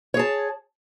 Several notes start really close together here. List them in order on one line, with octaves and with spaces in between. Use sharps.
C#5 G#4 A5